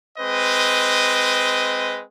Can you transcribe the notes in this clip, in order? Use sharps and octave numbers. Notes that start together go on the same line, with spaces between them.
G#3 C4 B4 D#5